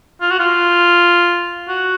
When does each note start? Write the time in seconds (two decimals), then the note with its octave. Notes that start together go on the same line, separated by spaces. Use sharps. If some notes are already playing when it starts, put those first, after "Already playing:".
0.21 F4
0.31 F#4
0.39 F4
1.68 F#4